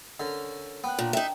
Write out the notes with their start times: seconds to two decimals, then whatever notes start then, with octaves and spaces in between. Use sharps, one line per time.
0.20 D3 C#4 A#4 F6
0.84 B3 G5 F#6
0.99 A#2 D4 A#5
1.13 D#4 E5 G5